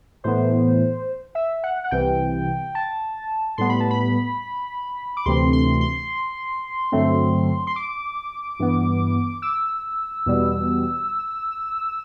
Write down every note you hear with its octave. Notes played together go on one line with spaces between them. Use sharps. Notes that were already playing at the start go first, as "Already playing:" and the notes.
A2 E3 B3 C5
E5
F#5
F#5
C2 C3 E3 G5
A5
A2 G3 B3 C6
B5
A5
B5
D6
D2 C3 E3 A3 C4 C6
C6
C6
G2 D3 F#3 A3 C4
C6
D6
G2 E3 B3
E6
E2 B2 G3 B3